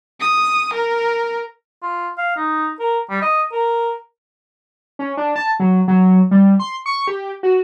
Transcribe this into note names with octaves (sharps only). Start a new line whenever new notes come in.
D#6
A#4
F4
F5
D#4
A#4
G3
D#5
A#4
C#4
D4
A5
F#3
F#3
G3
C6
C#6
G4
F#4